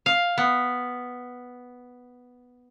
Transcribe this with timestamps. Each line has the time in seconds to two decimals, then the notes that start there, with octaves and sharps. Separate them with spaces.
0.06 F5
0.38 B3